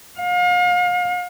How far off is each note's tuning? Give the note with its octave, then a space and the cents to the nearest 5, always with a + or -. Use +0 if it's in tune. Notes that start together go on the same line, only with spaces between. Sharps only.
F5 +40